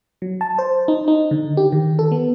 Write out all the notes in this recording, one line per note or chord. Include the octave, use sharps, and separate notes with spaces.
F#3
A5
C5
D#4
D#4
D3
G4
D#3
A4
B3